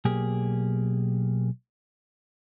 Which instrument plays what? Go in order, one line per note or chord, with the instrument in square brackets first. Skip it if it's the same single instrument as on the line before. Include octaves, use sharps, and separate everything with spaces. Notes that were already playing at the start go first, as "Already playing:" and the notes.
[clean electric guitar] B1 A#3 G4 G#4